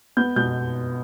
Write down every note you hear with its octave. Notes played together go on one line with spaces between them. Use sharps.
B3 G6
B2 G6